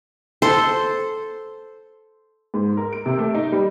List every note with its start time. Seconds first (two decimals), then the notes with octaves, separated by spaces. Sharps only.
0.42 A4 C5 C6
2.54 G#2
2.77 A#4
2.93 D7
3.06 C3
3.19 A3
3.35 D#4
3.52 G3